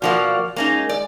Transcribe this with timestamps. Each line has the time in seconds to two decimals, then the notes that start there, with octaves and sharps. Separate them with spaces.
0.02 B2 F3 A#3 F#4 D5 F6
0.56 G#3 A#3 C#4 D#4
0.89 D5